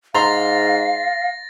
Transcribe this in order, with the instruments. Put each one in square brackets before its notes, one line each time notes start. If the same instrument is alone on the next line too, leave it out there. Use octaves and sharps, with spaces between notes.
[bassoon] G#2 [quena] F5 [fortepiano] A#5 C6 [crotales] A6 A#6